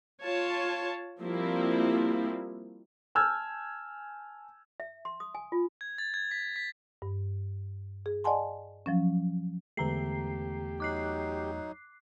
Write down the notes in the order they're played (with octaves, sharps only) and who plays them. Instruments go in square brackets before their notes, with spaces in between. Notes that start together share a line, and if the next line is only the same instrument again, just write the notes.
[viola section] F4 C#5 A5
F3 G3 A#3 C4 E4
[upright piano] G#5 A5 E6 F6 G6 G#6
[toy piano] E5
C6
D#6
G#5
F4
[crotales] G#6
A6
G#6
B6
B6
[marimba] G2
G#4
D5 D#5 F#5 G#5 A5 C6
F3 F#3 C#4
[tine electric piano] E2 A3 [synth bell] D3 A#5 C7 [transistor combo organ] G4
[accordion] F#3 D#4 [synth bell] D6 F#6 C7